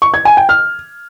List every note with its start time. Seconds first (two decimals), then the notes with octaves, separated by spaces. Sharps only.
0.02 C#6
0.14 G#6
0.25 G#5
0.37 G5
0.49 F6